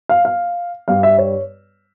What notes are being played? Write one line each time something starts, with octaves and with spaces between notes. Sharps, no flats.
F5
F5
G2 G3 F5
E5
C#5